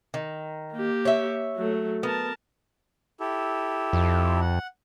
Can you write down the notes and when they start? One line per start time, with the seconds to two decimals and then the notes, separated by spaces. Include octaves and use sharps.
0.14 D#3
0.73 A#3 G4
1.05 C#5 E5
1.56 F#3 A3
2.03 B3 A#4 A5
3.20 E4 G4 A4
3.93 F2
4.41 F#5